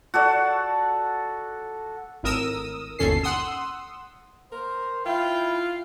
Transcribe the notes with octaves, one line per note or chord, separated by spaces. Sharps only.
F#4 A4 D5
G#1 A2 A#4 D#6 E6
G1 D#2 B2 C#4 A4 C7
F#5 C6 D#6 E6
A#4 C5
E4 F4 G5